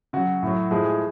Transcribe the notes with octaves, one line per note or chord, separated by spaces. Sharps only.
C#3 F#3 F#4
A2 F#3
A2 F3 G#3 G#4
G#4